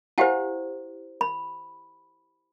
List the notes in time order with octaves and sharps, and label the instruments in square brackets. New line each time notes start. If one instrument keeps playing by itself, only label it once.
[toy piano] E4 G4 C5 [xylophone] F5 F#5 G#5
[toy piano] B5